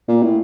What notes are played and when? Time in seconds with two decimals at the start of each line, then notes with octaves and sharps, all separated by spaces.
0.08 A#2
0.23 A2